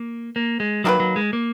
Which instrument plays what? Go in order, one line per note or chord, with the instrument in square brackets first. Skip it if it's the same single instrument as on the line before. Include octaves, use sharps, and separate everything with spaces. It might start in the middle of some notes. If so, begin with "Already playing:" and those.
Already playing: [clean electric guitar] A#3
A#3
G#3
[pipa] D#3 A#3 F4 B4 [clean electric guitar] F#3
[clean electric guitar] F#3
G#3
A#3